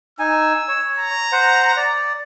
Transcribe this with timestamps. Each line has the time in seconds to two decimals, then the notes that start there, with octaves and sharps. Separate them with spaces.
0.19 D#4 G#5 E6
0.68 C#5
0.99 A#5
1.32 C5 F#5
1.77 D5